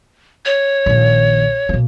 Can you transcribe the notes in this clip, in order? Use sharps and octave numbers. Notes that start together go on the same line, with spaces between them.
C#5
A#1 D#3
B2 A#3